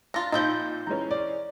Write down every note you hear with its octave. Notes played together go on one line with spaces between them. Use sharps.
D4 F4 A#5 A6 A#6
A#2 F3 C4 D#4 E4 G6
E3 G#3 C#4 A#5
D5